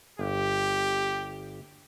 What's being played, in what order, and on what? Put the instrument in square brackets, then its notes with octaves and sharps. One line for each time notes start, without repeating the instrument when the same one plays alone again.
[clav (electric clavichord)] G1 [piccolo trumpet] G4